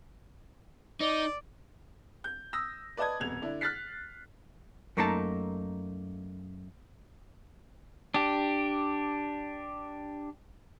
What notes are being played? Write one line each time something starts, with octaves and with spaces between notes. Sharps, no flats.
D#4 D5
G6
D#6 E6 A#6
B4 D5 D#5 A5 D#6 G#6
D#1 F2 B2 G#6 F7
D3 D4 E4
F6 F#6 A6 B6 C7
F#2 A3 A#3 D#4 G4 A5
D4 G4